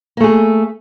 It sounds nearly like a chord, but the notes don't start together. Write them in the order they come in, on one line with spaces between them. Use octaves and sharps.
A#3 A3 G#4